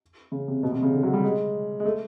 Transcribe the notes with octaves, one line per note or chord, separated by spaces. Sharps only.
C#3
C3
B2
C3
C#3
D3
F#3
G3
G#3
G#3
A3